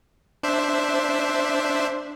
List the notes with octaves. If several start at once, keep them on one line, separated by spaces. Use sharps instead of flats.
D4 C5 E5